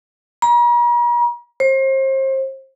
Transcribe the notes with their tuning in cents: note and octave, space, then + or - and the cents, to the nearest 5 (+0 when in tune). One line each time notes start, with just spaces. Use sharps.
A#5 +45
C5 +35